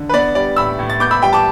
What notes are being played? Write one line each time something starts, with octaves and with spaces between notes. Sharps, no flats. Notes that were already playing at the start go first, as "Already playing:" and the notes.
Already playing: D3
B4
B3 D5
G3 D5
A2 B5 E6
A2
A6
B3 D6 G6
B5 E6
G3 G5 B5
A5 D6